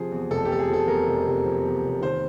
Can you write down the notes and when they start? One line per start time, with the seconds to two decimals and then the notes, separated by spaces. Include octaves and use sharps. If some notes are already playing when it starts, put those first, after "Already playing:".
Already playing: C3 F3 G#4
0.12 E2
0.30 F1 A4
0.45 G4
0.50 C3 A4
0.59 G#4
0.70 F3 A4
0.88 E2 A#4
1.07 F1
1.26 C3
1.45 F3
1.64 E2
1.83 F1
2.02 D#3 C5